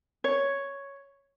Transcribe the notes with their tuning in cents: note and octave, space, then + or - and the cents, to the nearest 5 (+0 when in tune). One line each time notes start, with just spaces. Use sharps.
C#5 +0